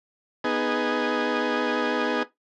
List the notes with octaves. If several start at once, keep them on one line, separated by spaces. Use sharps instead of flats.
B3 D#4 G#4